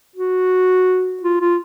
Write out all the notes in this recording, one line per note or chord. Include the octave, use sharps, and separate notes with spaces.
F#4
F4
F4